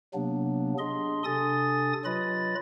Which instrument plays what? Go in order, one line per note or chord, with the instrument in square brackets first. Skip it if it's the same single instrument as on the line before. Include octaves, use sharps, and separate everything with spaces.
[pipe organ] C3 F#3 A#3 B3 D4
D4 G#4 D#5 C6
C3 D4 A4 G#5 D#6 A6
F#3 F4 B4 D#5 B5 A6